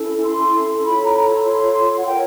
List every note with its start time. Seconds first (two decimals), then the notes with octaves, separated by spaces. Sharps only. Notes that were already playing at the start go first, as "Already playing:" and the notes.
Already playing: C#4 E4 A4
0.25 C6
0.86 F4 A4 C#5 B5
1.06 A#5
1.16 A#5
1.26 B5
1.46 C6
1.97 F#5
2.06 F4 A#4 C#5 G5